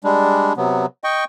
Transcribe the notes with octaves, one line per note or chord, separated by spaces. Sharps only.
G3 G#3 D4
C3 F#3 B3
D#5 G5 C#6